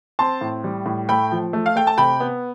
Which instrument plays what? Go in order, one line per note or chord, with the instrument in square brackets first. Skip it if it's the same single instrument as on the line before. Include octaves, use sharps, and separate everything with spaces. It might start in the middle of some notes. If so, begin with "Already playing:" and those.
[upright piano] C4 A5 C6
A2
G3
A2
A3 G5 B5
F3
A3
F5
A3 G5
A5
C3 G5 B5
B3